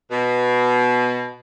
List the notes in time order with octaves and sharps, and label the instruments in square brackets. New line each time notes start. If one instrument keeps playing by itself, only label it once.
[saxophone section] B2